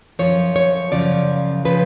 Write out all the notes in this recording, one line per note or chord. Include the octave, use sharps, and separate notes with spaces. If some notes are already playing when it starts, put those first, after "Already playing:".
F#2 C#3 F3 C#5
C#5
F#2 C#3 F3 D5
C#3 F3 B4